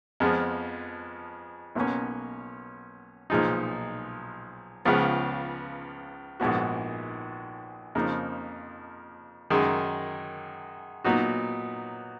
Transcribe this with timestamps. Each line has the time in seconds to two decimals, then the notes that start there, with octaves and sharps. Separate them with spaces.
0.20 F2 F3 G#3 B3
1.75 B1 B2 A#3 C#4
3.30 B1 A#2 F3 G#3 D#4
4.85 C#2 C#3 F3 B3
6.40 A#1 G#2 F3 B3 F#4
7.95 F2 C#3 F3 A#3 D#4
9.50 F#2 D#3 G#3
11.04 A#2 F#3 B3 D#4 F#4